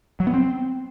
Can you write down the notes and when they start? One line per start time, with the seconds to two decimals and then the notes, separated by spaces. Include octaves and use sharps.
0.20 F#3
0.27 B3
0.34 C4